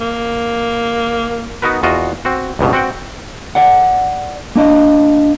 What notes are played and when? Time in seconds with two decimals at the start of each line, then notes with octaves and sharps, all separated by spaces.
0.01 A#3
1.62 B3 D#4 F#4 A#4 B4
1.83 E2 F4 F#4 D#5
2.25 C4 F#4
2.59 C#2 G2 B2
2.73 C4 F#4 F#5 G5
3.55 D5 F#5
4.55 A#3 D4 D#5